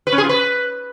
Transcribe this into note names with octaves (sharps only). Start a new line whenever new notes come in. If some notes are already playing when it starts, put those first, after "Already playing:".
B4
C#4
G#4
F4
B4